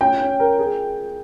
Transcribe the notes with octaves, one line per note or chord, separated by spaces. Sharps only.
C#4 G5
C#4
A#4
G#4